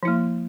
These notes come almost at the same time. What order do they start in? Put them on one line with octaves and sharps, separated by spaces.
F3 E4 A#3